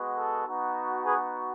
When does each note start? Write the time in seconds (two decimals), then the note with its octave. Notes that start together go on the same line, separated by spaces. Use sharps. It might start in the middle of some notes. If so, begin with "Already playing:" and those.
Already playing: G#3 B3 F#4
0.16 A4
0.45 B3 D#4 F#4
1.05 G#4 B4